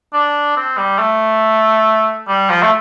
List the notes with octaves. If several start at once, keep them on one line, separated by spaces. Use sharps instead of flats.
D4
C4
G3
A3
G3
F3
A3